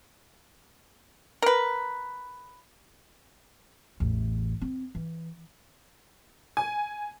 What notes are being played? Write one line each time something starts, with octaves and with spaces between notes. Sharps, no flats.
A#4 B4
A1 E2
C4
E3
G#5